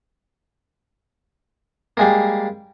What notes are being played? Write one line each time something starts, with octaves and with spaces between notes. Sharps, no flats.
G3 G#3 A#3